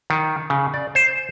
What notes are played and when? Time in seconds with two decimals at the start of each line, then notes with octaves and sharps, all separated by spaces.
0.10 D#3
0.50 C#3
0.74 D5
0.95 C5